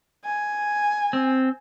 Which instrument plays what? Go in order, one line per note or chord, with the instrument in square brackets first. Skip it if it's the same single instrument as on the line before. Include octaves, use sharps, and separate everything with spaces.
[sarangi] G#5
[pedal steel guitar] C4